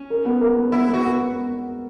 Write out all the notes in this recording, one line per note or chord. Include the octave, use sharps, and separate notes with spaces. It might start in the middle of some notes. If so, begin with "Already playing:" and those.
Already playing: C#4
A#4
B3
A#4
B3
B3 E4
B3
F#4
B3